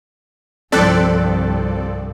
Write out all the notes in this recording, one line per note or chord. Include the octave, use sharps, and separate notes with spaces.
C2 G2 F3 C4 A4 D5 F#6 B6